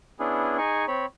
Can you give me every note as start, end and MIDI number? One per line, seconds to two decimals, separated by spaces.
0.19 0.58 59
0.19 0.58 61
0.19 0.58 62
0.19 0.58 64
0.19 0.58 68
0.58 0.85 63
0.58 0.85 68
0.58 0.85 80
0.58 0.85 85
0.88 1.06 60
0.88 1.06 73
0.88 1.06 83